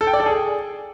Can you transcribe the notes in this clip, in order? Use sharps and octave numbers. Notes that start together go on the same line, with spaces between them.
A4
G5
D5
A4
G#4